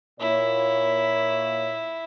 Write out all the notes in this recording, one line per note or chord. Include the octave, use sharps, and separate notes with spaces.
A#2 E4 C#5